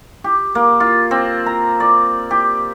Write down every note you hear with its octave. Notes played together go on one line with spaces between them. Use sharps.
G4
A#3
F4
C4
A#5
D5
G4